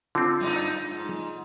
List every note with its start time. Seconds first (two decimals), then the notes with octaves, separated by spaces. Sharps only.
0.15 D3 C4 F4
0.40 F#2 D4 D#4
0.91 G#2